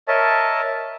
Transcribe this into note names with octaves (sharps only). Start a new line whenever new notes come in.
A#4 C#5 D#5 E5 A5